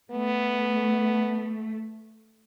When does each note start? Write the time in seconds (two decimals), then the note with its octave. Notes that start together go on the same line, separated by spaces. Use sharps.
0.11 A3 B3